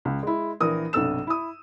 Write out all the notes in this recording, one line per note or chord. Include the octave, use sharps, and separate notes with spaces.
C#2
G#3 E4
A#1 E3 A#4 D#6
B1 G2 C3 A4 E6 E7
E4 D#6